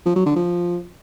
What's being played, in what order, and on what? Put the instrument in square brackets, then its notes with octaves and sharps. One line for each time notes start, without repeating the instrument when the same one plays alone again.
[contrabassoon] F3
F#3
D3
F3